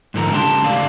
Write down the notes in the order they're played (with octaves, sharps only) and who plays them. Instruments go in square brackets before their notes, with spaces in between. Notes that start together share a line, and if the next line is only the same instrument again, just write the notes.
[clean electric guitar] G#2 D3 F3 A#4
C#2 G4 A5 C6
G#3 A3 D5 F5